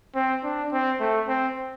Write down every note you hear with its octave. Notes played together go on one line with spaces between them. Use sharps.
C4
D4
C4
A3
C4